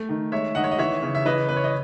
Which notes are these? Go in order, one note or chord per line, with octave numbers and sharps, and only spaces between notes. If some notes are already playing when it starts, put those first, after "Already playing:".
Already playing: A3
D#3
G#3 C#5 E5
D#3 D#5 F#5
C#5
D#5
E3 C#5 E5
C#3
E5
E3 B4 D#5
C#3 B4
C#5
D#5